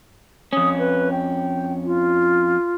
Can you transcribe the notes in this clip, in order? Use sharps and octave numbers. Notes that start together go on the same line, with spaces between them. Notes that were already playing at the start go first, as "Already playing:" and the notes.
F2 C#4 D#6
B4
G5
F4